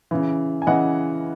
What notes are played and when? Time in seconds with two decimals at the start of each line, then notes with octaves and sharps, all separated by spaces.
0.11 C#3 E3
0.62 G#5
0.67 C#3 E3 D#5 F#5